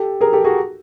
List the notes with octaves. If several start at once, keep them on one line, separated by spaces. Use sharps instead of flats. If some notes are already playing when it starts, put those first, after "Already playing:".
Already playing: G4 A4
G#4 A#4
G4 A4
F#4 G#4